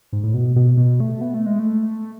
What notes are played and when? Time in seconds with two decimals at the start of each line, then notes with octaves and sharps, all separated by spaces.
0.13 G#2
0.24 A2
0.34 B2
0.56 B2
0.77 B2
1.00 A3
1.21 B3
1.34 A3
1.46 G#3
1.59 A3